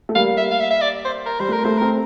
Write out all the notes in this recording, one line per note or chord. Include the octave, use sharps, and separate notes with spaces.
A3
G3 A#3 F5
E5
F5
E5
E5
D5
C5
A#4
G3 C5
A3 A#4
A3 A#3 C5
A3 C4 A#4